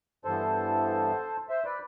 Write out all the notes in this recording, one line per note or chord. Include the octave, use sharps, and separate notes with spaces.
G2 E3 B3 A4 C5
C5 E5
B4 D5